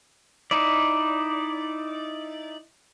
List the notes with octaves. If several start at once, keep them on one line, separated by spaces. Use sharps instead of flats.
D#4 E4 D5